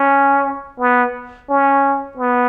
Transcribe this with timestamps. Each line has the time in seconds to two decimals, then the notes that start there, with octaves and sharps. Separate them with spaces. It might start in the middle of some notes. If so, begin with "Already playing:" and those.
Already playing: C#4
0.80 B3
1.50 C#4
2.18 B3